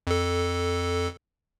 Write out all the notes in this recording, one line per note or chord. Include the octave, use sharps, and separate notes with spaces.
F2 A4